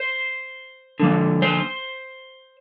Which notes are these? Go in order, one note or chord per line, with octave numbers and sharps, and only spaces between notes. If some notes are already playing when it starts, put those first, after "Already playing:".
Already playing: C5
D3 F3 A#3
C5